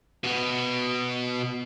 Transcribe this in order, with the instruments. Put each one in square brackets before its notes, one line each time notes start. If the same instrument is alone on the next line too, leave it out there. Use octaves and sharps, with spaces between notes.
[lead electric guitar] B2 B3